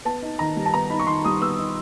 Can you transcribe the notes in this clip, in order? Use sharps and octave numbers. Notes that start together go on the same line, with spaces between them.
B3 A5
D#4
D#3 A#5
G3
A5
B3 A#5
D#4 B5
C#6
D#3 C6
G3 D#6
B3 E6
D#4